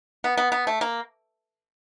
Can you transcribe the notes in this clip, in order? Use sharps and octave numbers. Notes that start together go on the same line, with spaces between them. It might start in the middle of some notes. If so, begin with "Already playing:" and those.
B3
B3
B3
A3
A#3